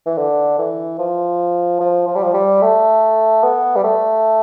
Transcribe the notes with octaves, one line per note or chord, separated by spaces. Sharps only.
E3
D3
E3
F3
F3
F3
G3
F3
G3
A3
B3
G3
A3